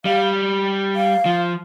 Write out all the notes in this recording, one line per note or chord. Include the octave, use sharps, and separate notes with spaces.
G3 F5
F5
F3